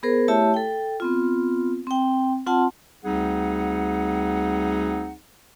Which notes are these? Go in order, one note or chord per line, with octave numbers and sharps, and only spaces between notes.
B3 G#4 A#4 C5
A3 E4 G4 C#5 E5 A5
A4 G5
B3 C4 F4
C4 G5
C4 F4 F#5 A5 C6
D2 G3 C4 D#4 G#4 F#5